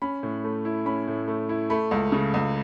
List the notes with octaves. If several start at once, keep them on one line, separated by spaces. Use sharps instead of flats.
C#4 B5
A2
A3
E4
C#4 B5
A2
A3
E4
A3 B5
C#2
C#3
C#2